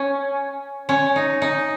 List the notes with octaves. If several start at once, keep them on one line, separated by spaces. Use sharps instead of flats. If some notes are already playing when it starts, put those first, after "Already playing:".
Already playing: C#4
C#4
D#4
D#4